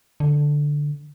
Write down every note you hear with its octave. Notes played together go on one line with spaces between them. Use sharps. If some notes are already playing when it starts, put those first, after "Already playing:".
D3